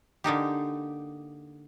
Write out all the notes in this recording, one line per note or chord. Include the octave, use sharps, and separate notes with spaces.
D3 A#3 D#4 G4